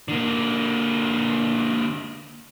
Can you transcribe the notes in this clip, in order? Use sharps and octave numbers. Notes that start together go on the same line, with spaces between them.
D3 A#3